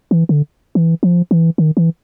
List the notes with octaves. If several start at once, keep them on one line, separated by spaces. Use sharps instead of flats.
E3
D3
E3
F3
E3
D#3
E3